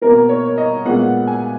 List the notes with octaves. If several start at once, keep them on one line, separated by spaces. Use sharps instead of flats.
B2 A#3 A#4
C#5
D#5
A#2 G#3 B3 F#5
G#5